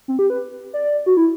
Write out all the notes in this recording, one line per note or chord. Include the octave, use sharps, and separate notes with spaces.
C4
G4
B4
D5
F#4
E4